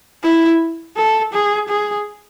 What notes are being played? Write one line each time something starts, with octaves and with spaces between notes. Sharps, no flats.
E4
A4
G#4
G#4